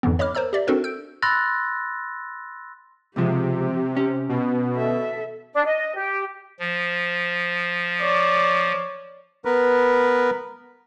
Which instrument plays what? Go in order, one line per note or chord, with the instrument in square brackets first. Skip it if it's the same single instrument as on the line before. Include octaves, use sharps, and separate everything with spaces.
[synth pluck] F2 G#2 D3 E3 B3
C#5 D#5 B5 D6 F6
A#4 C5 C#5 A#5 E6
G4 D5 E5
C4 D4 F#4 A4 A#4 C5
E6 G6 D7
[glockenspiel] B5 C6 E6 F#6 A6 A#6
[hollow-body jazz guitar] C#2 F3 G#3 [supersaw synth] C3 [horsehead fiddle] G4
[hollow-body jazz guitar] C#4
[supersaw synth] B2
[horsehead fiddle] A4 E5
[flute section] D4
D#5
G4
[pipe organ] F3
[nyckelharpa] C#5 D5
[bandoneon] B3 A#4 B4